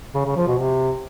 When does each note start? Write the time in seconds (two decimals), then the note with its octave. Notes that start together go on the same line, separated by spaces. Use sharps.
0.15 C#3
0.25 C#3
0.36 F3
0.47 B2
0.58 C3